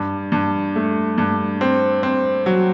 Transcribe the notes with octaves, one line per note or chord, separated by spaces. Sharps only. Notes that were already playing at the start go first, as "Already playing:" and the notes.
Already playing: G2
G2
A3
G2
C4
C4
F#3